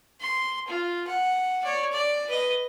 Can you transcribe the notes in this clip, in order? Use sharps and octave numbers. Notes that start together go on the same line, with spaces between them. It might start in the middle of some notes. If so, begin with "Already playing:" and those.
C6
F4
F#5
C#5 D5
D5
B4 D#5